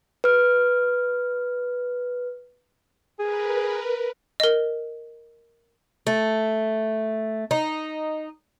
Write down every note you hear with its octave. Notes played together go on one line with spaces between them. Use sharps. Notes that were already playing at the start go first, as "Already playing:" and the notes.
B4 F6
G#4 A#4 B4
A#4 D#5
A3
D#4